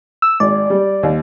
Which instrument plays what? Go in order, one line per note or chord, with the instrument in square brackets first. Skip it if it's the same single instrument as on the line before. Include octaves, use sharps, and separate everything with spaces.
[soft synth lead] E6
[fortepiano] G#1 [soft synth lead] D5
[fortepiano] G3
D#2